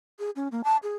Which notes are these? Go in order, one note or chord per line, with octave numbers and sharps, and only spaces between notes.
G#4
C#4
A#3
A5
G#4